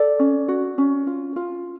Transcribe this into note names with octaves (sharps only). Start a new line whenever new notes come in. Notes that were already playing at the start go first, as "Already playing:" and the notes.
Already playing: A4 D5
C#4
F#4
C#4
F4
F4